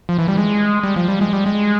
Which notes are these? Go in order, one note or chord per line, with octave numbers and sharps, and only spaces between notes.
F3
E3
G3
G#3
G3
F3
G3
G#3
G3
G#3